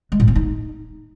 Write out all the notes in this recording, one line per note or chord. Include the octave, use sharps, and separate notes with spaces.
G#3
A2
C4
D#4